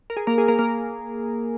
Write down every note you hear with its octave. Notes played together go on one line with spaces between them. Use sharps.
A#4
G#4
A#3 A#4
G#4
A#3 A#4
A#3 A#4